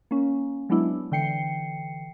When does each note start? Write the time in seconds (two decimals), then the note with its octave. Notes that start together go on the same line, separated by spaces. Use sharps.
0.11 A#3 C#4
0.69 F#3 G#3 B3 D4 E4
1.12 D3 E3 G5 C7 C#7